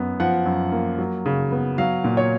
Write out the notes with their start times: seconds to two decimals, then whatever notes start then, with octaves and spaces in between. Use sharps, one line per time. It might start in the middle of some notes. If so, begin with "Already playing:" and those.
Already playing: F#2 B3
0.20 F3 F#5
0.46 F#2
0.72 A#3
0.98 F#3
1.26 C#3
1.52 B3
1.78 F#3 F5
2.04 A#2
2.17 C#5